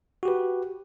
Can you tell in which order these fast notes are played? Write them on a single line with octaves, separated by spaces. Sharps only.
F#4 G4 B4